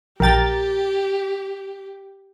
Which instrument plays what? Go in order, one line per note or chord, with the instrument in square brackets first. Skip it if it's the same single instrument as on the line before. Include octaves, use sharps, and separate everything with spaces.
[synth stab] A#1 A6 [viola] G4 [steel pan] A#4 G5 A#5